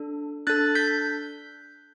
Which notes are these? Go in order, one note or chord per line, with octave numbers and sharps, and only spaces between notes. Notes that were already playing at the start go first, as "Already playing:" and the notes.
Already playing: D4 A4
D4 A4 F#6 A6
G6 B6